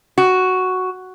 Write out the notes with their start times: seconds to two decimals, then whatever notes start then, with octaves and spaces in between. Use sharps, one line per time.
0.18 F#4